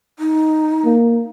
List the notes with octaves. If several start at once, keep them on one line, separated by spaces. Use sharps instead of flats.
D#4
A#3